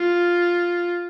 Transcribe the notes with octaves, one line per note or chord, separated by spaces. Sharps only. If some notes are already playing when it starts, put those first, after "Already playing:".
Already playing: F4